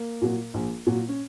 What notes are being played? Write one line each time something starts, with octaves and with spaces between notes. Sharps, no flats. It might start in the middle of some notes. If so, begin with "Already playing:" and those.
Already playing: A#3
A#2 F#3
A#1
A#2 F#3
C#4